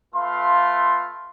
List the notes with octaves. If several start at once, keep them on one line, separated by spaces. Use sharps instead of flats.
A3 F4 B4 F5 C6